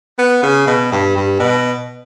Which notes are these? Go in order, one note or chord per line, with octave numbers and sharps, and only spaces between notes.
B3
C#3
B2
G2
G2
B2